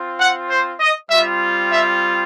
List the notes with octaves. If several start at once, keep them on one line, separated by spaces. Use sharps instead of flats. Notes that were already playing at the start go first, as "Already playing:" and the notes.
Already playing: C4 F4
F#5
C5
D#5
G3 C4 F4 E5
E5